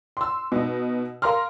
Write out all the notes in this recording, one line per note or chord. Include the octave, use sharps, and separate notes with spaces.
C6 E6
B2 D#4
A#4 F5 A#5 C6 F6